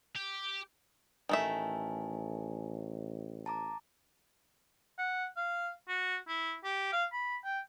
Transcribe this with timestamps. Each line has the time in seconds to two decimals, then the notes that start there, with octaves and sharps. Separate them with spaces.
0.16 G4
1.29 A1 D#3 A3 E5 G#5
3.46 A5 A#5 D6
4.99 F#5
5.37 F5
5.88 F#4
6.28 E4
6.64 G4
6.93 F5
7.12 B5
7.44 G5